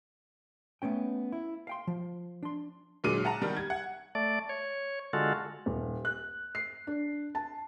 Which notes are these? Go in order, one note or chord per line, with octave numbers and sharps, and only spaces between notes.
A3 B3 C#4 G5
E4
F5 G5 C6
F3
D4 C6
A#2 D3 F#3 G#3 D6 D#7
F#5 A5 A#5
D#3 G3
G#6
F#5
A3 D5
C#5
D3 G#3 F4 F#4 A4
D#1
F#6
C7
D4
A5